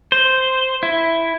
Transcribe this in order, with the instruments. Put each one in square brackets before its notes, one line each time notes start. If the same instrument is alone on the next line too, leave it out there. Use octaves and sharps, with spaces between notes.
[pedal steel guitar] C5
E4